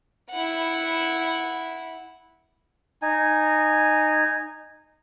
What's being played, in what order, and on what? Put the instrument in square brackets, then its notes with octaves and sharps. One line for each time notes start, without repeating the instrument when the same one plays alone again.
[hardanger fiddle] E4 F#5
[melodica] D#4 G#5